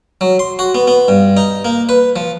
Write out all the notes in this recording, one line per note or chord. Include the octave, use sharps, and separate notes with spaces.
F#3
C6
F#4
B3
B3
G2
D#4
A#3
B4
F3